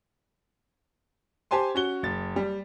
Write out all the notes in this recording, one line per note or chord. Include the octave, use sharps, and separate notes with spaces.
G4 C5 G#5 A5 C6
C#4 F#4 G7
F#1 A6
G3